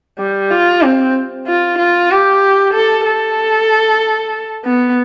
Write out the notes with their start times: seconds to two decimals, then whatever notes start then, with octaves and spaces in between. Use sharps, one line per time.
0.19 G3
0.51 F4
0.83 C4
1.47 F4
1.78 F4
2.10 G4
2.73 A4
3.05 A4
4.65 B3